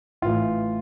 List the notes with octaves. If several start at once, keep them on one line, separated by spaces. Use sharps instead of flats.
A1 A2 E3 F4